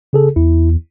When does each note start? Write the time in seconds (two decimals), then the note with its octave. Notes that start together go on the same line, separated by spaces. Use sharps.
0.13 C#3 G#4 A4
0.36 E2 E4